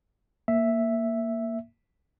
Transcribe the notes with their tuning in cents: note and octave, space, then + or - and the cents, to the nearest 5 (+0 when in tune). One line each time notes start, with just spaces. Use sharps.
A#3 +0 E5 +0